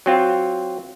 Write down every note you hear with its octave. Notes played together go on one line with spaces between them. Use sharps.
F#3 C4 F4